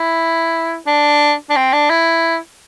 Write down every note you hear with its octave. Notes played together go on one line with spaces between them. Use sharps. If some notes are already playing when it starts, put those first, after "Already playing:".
Already playing: E4
D4
D4
C4
D4
E4